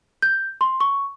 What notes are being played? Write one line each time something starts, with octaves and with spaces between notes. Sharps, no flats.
G6
C6
C#6